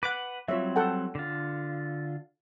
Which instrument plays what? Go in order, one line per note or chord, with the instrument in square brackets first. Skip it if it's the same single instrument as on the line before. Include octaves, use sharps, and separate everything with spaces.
[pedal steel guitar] B4 F#5 [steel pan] D6
[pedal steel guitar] F#3 G3 C4 [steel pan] F4 C#5 E5
[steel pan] A4 F#5 G5
[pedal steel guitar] D3 F4